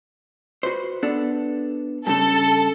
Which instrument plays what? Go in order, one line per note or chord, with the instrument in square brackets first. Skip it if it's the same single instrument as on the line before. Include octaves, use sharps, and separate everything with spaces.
[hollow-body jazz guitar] F#4 B4 C5
B3 D4 A4
[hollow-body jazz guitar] G2 C#3 [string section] A4